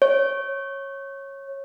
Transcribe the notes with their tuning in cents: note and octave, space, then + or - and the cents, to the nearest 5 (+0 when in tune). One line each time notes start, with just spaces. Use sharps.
C#5 -15